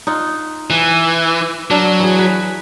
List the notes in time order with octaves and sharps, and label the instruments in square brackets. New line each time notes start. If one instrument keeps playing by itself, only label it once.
[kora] D#4 F4 F#5
[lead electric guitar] E3
[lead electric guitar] F#3 [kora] D4 A#4
[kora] E3 G#4
B4